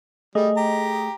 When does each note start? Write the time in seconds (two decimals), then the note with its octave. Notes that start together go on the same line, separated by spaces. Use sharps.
0.35 G3 A3 G#4 D#5
0.57 G4 A#5